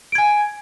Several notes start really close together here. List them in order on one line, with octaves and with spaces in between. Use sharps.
D7 G#6 G#5